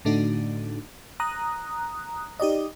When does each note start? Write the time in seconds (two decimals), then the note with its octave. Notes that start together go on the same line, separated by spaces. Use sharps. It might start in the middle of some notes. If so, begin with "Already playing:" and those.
0.05 A2 D3 A3 D4 D#4 F#4
1.20 A#5 D#6 F#6
2.40 D#4 G4 D5 D#5